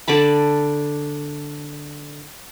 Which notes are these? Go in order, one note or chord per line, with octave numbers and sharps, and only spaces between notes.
D3 D5 A5 B5